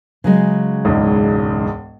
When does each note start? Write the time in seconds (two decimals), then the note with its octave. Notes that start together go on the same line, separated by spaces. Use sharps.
0.24 C#3 F#3 G#3
0.85 E1 C#2 G#2